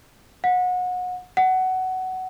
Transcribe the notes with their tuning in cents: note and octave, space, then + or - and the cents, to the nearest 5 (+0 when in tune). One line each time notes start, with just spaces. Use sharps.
F#5 -30
F#5 +15